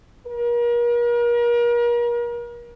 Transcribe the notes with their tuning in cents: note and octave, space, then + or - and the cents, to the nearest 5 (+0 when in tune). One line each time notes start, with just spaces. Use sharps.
A#4 +40